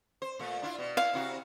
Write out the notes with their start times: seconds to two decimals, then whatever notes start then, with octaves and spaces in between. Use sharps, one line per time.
0.22 C5
0.39 A#2 A3
0.62 D4 E4 F4
0.78 B2
0.97 E4 F5
1.13 C3 E4 F#4